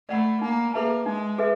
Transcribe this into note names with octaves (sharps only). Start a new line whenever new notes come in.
A3 D5 F#5 B5
A#3 D#4
A#3 G#4 B4 E5 A5
G#3 D#4
G#4 B4 E5